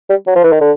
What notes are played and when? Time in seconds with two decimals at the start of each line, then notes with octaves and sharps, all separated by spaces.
0.10 G3
0.27 F#3
0.36 F3
0.44 E3
0.52 D#3
0.61 D3